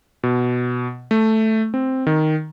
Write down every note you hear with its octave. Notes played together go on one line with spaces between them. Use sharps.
B2
A3
C4
D#3